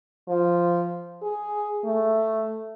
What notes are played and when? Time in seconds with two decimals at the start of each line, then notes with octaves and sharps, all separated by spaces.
0.29 F3
1.22 G#4
1.85 A3